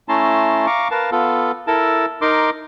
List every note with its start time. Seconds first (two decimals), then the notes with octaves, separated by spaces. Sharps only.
0.09 A3 C#4 E4 A5 A#5 C6
0.66 F5 A#5 C#6 D6
0.91 A#4 B4 F5 A5
1.12 B3 F4 A4
1.67 E4 A4 A#4 A5
2.21 D#4 A#4 C6 D6